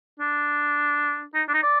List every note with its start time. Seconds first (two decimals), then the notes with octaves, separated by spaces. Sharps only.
0.19 D4
1.34 D#4
1.48 D4
1.54 D#4
1.63 D5